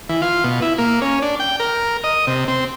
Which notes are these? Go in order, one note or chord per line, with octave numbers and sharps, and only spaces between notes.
E3
F4
B2
E4
A#3
C#4
D4
G5
A#4
D#5
C3
C4